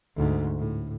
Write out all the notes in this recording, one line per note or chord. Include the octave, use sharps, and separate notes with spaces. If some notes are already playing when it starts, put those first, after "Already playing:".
D2 G#2
A2